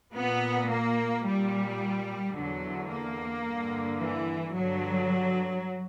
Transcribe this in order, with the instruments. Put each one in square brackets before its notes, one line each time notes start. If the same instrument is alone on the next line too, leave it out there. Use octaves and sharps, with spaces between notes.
[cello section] A#2 B3
A#3
A#2 G3
E2 D3 F#3
A#3
G2 D3
E3
G2 D3 F#3